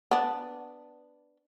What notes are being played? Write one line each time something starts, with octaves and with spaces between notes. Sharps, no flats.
B3 D4